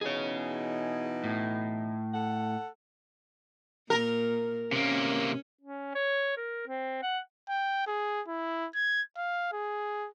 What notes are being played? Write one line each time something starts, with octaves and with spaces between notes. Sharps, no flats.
B2 E3 D#4 G#4 C#5
A2
A4 F#5
A#2 A#4
C3 A#3 C#4
C#4
C#5
A#4
C4
F#5
G5
G#4
E4
G#6
F5
G#4